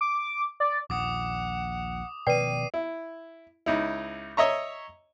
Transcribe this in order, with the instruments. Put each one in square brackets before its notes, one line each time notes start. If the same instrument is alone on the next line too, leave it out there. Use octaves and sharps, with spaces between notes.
[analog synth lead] D6
D5
[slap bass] A#1 D#2 A#2 [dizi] F#5 [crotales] D6 D#6
[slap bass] B2 D#3 F3 [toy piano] B4 D5 G5 [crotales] C7 D#7
[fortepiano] E4
C#2 D#4 E4
C#5 D#5 E5 A#5 C#6